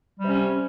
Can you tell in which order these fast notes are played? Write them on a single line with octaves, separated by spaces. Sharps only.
G3 C3 C#4